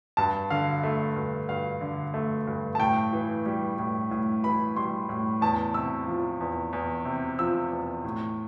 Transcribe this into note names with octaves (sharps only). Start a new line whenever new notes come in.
G2 A5
D3 F5
A3
G2
G2 F5
D3
A3
G2
A5
A2 G5
E3
G3
A2
A2
E3 B5
G3 C6
A2
E2 A5
C3 E6
F3
E2
E2
C3
F3 E6
E2
A2